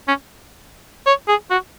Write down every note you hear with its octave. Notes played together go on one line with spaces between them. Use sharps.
C#4
C#5
G#4
F#4